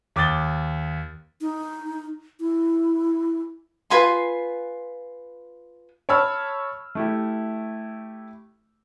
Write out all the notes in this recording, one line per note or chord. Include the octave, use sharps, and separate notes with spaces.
D#2 D6 D#6 A6 G7
D#4
E4
F4 B4 G#5 C6
C#5 A5 B5 E6 F6
A3 E4 G4